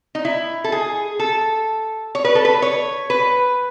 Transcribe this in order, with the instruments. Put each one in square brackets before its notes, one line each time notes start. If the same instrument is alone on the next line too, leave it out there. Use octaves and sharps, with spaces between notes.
[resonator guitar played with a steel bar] D#4
E4
A4
G#4
A4
C#5
B4
A4
B4
C#5
B4